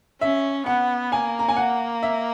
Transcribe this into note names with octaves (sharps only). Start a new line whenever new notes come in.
C#4 E5
B3 F#5
A#3 G#5
A#5
G#5
F#5
E5